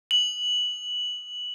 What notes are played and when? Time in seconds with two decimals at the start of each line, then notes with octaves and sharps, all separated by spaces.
0.11 F#7